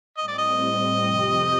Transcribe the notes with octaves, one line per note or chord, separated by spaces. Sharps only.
A2 G3 C4 D#5
D5
D#5
F2 C3 F3 C4 G4